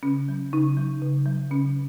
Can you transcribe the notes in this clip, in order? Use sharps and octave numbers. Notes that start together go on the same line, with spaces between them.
C#3 C#4
F#3
C#3 D#4
F#3
C#3
F#3
C#3 C#4